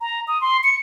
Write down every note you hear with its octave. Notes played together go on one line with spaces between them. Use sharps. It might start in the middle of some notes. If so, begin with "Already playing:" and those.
A#5
D#6
C6
C#7